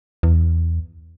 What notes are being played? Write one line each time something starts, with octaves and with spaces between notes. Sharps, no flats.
E2